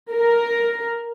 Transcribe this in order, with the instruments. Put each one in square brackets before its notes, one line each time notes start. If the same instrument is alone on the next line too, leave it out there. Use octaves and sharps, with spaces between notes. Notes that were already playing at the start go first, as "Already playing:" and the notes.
[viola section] A#4